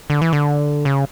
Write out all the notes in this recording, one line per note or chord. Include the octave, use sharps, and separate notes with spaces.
D3
E3
D3
C#3